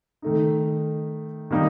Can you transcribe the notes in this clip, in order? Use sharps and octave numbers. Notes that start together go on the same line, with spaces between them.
D#3 A3 D#4
D#3 G3 A#3 D#4